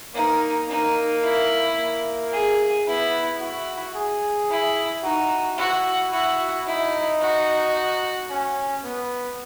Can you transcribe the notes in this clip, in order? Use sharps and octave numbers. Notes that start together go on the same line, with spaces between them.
A#3 D#4
A#3 D#4
E4
A#3
G#4
B3 E4
E4 F#4
G#4
E4
D#4 F#4
E4 F#4
E4 F#4
D#4 E4
F#4
C#4
B3